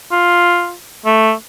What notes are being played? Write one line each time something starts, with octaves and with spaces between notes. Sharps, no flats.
F4
A3